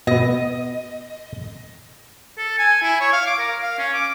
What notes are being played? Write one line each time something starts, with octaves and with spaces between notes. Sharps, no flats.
B2 B3 D#5
A4
G#5
E4
C#5
F5
D6
A#4
F5
C#4
D6